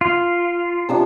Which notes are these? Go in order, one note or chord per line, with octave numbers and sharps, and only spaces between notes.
F4
C3 F3 D4